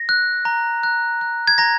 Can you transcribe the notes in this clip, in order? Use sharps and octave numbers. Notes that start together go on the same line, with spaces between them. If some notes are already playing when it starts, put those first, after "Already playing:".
Already playing: A#6
F#6
A#5
F#6
F#6
G#6
A#5 A#6